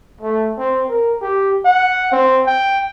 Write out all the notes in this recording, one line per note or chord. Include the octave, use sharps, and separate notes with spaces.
A3
C4
A#4
G4
F#5
C4
G5